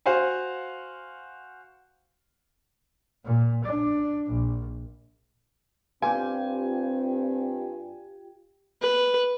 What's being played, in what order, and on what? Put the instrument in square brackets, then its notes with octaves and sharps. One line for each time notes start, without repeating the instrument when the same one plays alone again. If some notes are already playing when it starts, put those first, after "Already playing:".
[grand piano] F#4 C5 F5 F#5 G#5
[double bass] A#2
D4
A#1
[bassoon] G2 [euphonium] C4 [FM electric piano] F4 G4 G5 [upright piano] G#5
[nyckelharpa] B4